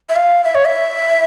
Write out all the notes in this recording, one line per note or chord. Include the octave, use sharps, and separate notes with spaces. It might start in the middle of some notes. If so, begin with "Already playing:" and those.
E5
F5
E5
C#5
E5